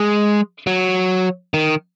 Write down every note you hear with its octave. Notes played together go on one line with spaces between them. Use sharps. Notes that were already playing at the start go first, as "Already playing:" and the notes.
Already playing: G#3
F#3
D#3